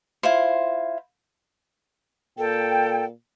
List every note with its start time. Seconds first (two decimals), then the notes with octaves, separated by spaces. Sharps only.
0.23 E4 F4 C5
2.38 A#2 A4 G5